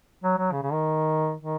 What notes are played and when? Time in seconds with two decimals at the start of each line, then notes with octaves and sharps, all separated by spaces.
0.24 F#3
0.38 F#3
0.52 C#3
0.63 C#3
0.72 D#3
1.41 D#3